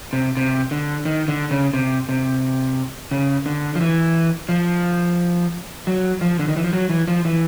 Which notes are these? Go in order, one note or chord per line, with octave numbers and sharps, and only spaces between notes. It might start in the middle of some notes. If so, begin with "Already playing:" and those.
C3
C3
D3
D#3
D3
C#3
C3
C3
C#3
D3
F3
E3
F3
F#3
F3
D3
D#3
E3
F3
F#3
E3
F3
E3